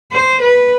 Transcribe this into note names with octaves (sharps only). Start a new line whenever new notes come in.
C5
B4